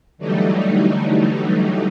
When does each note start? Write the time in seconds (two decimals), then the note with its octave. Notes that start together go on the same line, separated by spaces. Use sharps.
0.18 D3 E3 F#3 G3 A3 D#4